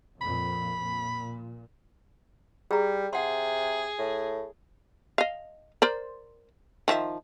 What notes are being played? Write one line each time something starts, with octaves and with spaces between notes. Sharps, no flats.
F2 A#2 B5
A#2
G3 G#4 A#5
C3 G#4 F#5 C6
A2
D#5 F5
A#4 C5 D5
D#3 F3 E5